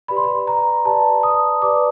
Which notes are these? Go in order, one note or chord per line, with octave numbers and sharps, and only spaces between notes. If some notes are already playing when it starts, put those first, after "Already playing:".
G4 B4 D5 B5
C6
B5
A#5
G4 B4 D5 A5
D#6
G4 B4 D5 D6